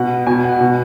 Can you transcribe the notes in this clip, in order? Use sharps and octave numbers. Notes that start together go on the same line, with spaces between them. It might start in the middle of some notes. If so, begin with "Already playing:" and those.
Already playing: B2 F#5
B2 G#5
F#5
B2